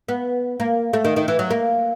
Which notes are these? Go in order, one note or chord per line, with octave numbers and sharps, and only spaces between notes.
B3
A#3
A3
D#3
D#3
E3
F#3
A#3